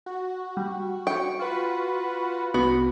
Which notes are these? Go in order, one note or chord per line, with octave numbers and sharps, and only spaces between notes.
F#4
G3
G5 C#6
F4 F#4 B4
C2 B3 F#4